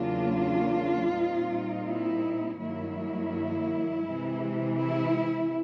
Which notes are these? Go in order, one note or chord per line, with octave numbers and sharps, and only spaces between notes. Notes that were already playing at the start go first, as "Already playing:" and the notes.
Already playing: E2 C#3 F#3 A#3 D4 F4
A#2 G3 C4 D#4
E4
G2 D#3 F#3 A#3 E4
C3 E3 G#3
E4